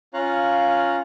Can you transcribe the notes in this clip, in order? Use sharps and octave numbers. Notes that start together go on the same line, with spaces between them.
C#4 F4 C#5 F5 A#5 F#6